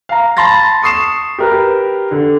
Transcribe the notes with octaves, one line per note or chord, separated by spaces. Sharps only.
F5 A#5
A5 B5 C6 A6 A#6
C#6 D#6 C7 E7
G4 A#4 B4
D3